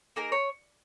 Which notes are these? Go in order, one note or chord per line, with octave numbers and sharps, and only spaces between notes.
A#3 D#4 G#4 A#4
C#5